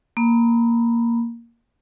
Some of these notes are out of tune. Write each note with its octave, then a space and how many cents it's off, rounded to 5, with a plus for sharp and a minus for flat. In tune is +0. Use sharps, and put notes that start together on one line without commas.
A#3 +0 B5 +0